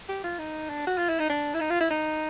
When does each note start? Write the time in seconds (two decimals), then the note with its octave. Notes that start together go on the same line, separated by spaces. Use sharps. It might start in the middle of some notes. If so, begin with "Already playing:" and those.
0.09 G4
0.24 F4
0.39 D#4
0.69 D4
0.87 F#4
0.98 F4
1.09 E4
1.20 D#4
1.30 D4
1.54 E4
1.61 D#4
1.70 F4
1.80 E4
1.90 D#4